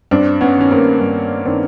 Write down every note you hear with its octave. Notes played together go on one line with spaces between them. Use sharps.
G2 C4 D4
B3 C#4
D#3 C#4
A#3 C4
G2
D#3 C4 D4